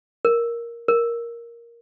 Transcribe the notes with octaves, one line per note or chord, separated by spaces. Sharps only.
A#4
A#4